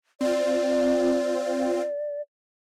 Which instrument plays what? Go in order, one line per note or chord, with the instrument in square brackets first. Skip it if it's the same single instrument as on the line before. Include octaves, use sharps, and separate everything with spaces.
[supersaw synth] C4 F4 [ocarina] D5